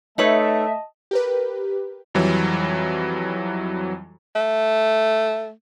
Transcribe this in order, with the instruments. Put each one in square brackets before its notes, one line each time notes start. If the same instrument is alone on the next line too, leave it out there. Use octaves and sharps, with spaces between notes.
[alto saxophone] A3 [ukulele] D#4 B4 C#5 [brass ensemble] D#5 A5 [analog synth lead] E5
[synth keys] G4 A#4 B4
[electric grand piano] F2 E3 F#3 G3
[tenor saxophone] A3